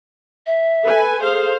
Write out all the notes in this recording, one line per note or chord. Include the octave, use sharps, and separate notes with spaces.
E5
A4 B4 G#5
G#4 A4 C5 F5